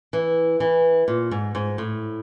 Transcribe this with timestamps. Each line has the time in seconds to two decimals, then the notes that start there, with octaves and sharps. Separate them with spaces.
0.13 E3
0.60 E3
1.08 A#2
1.31 G#2
1.55 G#2
1.78 A2